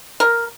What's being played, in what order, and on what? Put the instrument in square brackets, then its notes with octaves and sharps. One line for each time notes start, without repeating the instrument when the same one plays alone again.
[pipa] A#4